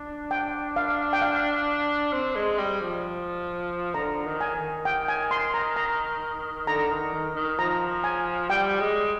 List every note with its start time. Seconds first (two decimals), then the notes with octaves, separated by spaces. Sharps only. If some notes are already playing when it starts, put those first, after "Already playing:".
Already playing: D4
0.31 G5
0.76 F5
1.13 G5
1.22 F5
2.13 C4
2.36 G#3
2.58 G3
2.81 F3
3.94 D3 A#5
4.25 D#3
4.41 G#5
4.55 D#3
4.85 G5
5.08 G#5
5.31 C6
5.54 A#5
5.76 A#5
6.67 D3 A#5
6.91 D#3
7.14 D#3
7.35 D#3
7.59 F3 A#5
8.04 G#5
8.50 G3 G5
8.80 G#3